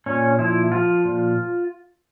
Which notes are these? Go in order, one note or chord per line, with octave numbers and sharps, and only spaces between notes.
A#2 C#4
F3 E4
F3 F4
A#2